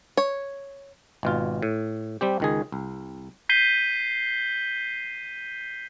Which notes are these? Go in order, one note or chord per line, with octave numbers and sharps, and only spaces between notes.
C#5
G#1 B2 F4
A2
G3 C4 G4
C#2 D#3 G#4
C2
G6 B6 C7 D#7 G7